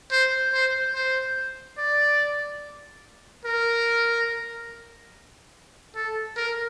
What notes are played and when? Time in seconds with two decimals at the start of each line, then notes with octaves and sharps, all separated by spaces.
0.11 C5
0.53 C5
0.95 C5
1.78 D5
3.45 A#4
5.95 A4
6.37 A#4